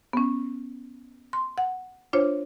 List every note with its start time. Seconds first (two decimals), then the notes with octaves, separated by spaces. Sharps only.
0.13 B3 C#4
1.33 C6
1.58 F#5
2.13 D4 F4 C5 C#5